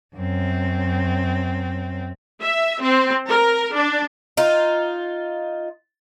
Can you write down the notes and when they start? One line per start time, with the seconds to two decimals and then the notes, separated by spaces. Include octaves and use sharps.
0.16 F#2 C4
2.41 E5
2.82 C4
3.28 A#4
3.74 D4
4.37 D#4 F4